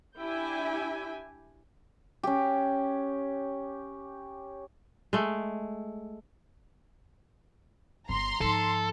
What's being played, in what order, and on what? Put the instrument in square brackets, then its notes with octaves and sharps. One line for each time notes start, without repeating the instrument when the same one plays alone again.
[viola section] D4 E4 G4 E5 G5 G#5
[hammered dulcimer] C#4 G4
[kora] G#3 A3
[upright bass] G1 G3 [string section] A#5 C6
[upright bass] G#2 F3 [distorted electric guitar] A4